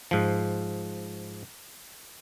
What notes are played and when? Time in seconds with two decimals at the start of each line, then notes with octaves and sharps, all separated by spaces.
0.11 G#2 F3